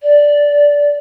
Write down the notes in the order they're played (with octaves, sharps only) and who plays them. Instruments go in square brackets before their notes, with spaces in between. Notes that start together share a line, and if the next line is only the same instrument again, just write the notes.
[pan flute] D5